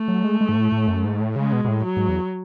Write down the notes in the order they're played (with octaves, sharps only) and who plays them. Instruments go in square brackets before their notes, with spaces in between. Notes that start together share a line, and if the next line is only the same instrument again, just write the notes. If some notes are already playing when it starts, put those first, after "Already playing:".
Already playing: [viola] A3
[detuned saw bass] F#3
G#3
G#3
G#2
A2
A2
F#2
G#2
A2
[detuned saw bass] C#3 [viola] G#3
[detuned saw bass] B2
B2
A2
[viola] F#3
[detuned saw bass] G#2
E2